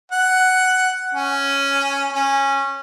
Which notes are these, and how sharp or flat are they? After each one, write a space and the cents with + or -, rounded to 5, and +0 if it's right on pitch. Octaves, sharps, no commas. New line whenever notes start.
F#5 +10
C#4 +0
C#4 -15